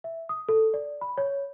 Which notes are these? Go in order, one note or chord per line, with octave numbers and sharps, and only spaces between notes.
E5
D#6
A4
D5
B5
C#5